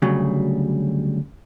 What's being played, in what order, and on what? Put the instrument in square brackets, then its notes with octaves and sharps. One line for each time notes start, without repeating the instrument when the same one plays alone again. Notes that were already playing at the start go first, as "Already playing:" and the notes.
[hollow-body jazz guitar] D2 C#3 F#3 G3